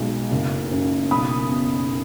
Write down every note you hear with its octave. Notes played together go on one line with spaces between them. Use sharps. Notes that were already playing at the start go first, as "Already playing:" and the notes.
Already playing: B1 G#3
F#1
F#2
B1 B5 D#6
B2